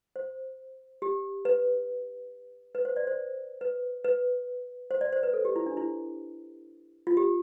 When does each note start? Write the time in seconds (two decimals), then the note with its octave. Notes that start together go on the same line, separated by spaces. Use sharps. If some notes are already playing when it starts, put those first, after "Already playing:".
0.16 C5
1.02 G4
1.45 B4
2.75 B4
2.85 C5
2.96 D5
3.07 C5
3.61 B4
4.04 B4
4.91 C5
5.01 D5
5.13 C5
5.23 B4
5.34 A4
5.45 G4
5.56 E4
5.66 D4
5.77 E4
7.07 F4
7.17 G4